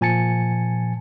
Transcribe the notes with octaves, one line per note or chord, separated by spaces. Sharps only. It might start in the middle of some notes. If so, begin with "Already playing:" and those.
A#2 F3 G#5 A5 A6 C#7